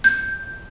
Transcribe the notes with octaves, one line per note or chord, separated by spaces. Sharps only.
G6